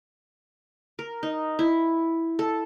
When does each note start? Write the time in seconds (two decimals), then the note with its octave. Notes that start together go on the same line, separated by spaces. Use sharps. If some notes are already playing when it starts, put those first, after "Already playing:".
0.99 A#4
1.23 D#4
1.59 E4
2.39 A4